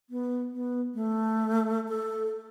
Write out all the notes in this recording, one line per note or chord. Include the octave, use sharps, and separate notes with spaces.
B3
B3
A3
A4